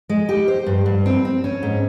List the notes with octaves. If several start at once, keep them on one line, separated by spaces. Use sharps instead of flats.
G#3
G4
C5
G2
G2
C4
C4
C#4
G#2